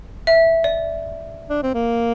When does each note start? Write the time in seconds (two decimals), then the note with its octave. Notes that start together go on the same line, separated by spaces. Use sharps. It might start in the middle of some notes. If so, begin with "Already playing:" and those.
0.27 E5
0.64 D5
1.50 D4
1.63 C4
1.74 A#3